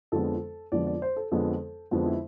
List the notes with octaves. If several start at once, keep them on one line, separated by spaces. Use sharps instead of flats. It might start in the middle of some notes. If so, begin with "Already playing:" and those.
F2 D3 F3 G#3 B3 A4
F2 D3 F3 G#3 B3 D5
D5
C5
A4
F2 D3 F3 G#3 B3 A4
F2 D3 F3 G#3 B3 F4
E4